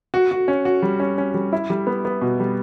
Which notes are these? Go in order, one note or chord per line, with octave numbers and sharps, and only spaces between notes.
F#4
F#4
C#4
F#4
G3
C#4
C#4
G3
E4
G3
B3
B3
B2
G3